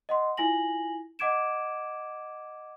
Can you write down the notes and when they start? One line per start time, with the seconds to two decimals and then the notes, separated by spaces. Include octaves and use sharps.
0.09 D#5 F#5 C6
0.37 E4 F4 G#5 A#6 F#7
1.19 D#5 F#5 D6 G#6 D7 E7